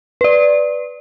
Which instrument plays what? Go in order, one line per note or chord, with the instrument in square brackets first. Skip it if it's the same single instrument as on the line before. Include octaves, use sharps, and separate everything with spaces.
[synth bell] B4 D5